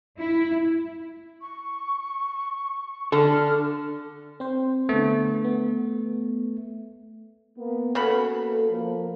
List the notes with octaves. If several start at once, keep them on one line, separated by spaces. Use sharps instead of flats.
E4
C#6
D3 A4 F6
C4 C5
D3 A3 B3
B3
A#3 B3
C#3 A#3 B3 F#4 A4 B5
F3 A#3